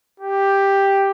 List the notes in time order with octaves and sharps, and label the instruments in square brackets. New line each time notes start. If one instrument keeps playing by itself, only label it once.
[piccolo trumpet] G4